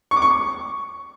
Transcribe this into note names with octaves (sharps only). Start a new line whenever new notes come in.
C#6
D6
C#6